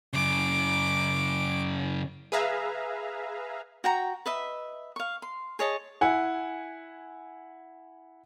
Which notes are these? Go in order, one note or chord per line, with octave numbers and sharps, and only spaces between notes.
F#2 C#3 D6
G#4 B4 E5 F5 A#5
F#4 G5 A#5
B4 D#5 E5
F5 C#6
C6
G#4 C#5 D#5 A5
E4 F#5 G#5